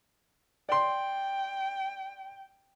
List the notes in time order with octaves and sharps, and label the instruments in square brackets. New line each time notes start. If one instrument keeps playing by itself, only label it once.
[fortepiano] D5 C6 [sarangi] G5